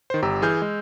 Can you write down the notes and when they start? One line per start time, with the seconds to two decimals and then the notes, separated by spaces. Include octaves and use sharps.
0.10 D#3 C5
0.22 G1 G4 A#5 E6
0.42 E3 G#4 F6 G6
0.62 G#3